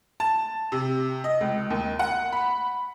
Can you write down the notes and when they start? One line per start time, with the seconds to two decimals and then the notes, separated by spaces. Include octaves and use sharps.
0.20 A5
0.72 C3
1.24 D#5
1.41 C#2
1.70 D#2
1.99 F#5
2.32 B5